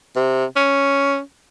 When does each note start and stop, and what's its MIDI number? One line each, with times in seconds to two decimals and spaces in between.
0.16 0.44 48
0.56 1.20 61